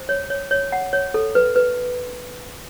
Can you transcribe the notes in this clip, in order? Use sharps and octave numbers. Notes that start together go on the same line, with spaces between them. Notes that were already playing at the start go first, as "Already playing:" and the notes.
Already playing: C5
C#5
C#5
C#5
F#5
C#5
A4
B4
B4